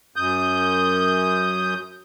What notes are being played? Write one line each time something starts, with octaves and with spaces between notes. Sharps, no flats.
F#2 D#6 G6